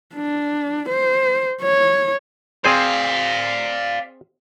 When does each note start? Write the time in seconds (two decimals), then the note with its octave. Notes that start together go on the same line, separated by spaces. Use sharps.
0.15 D4
0.89 C5
1.63 C#5
2.64 C4 G#4 C5 D5 F5